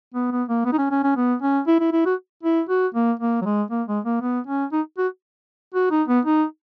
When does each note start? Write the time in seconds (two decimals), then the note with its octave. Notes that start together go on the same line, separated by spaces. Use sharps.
0.14 B3
0.31 B3
0.49 A#3
0.65 B3
0.72 D#4
0.78 C#4
0.91 C#4
1.04 C#4
1.16 B3
1.42 C#4
1.67 E4
1.80 E4
1.92 E4
2.06 F#4
2.43 E4
2.69 F#4
2.94 A#3
3.20 A#3
3.42 F#3
3.45 G#3
3.71 A#3
3.88 G#3
4.05 A#3
4.22 B3
4.47 C#4
4.72 D#4
4.98 F#4
5.74 F#4
5.91 D#4
6.08 B3
6.26 D#4